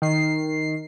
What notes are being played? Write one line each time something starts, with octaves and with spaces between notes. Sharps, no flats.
D#3 C7